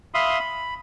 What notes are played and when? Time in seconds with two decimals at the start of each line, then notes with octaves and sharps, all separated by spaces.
0.14 E5 F5 B5 C6 D#6
0.39 B5